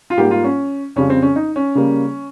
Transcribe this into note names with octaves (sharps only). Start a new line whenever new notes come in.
F4
G#2 G3 A#3 G4
F4
C#4
F2 C#3 G3 C#4
C4
C#4
D#4
C#4
C#3 G3 A#3